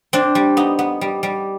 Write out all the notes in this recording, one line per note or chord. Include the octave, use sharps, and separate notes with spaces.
C4 D4
G3
B3 D#4
B3
G3
G3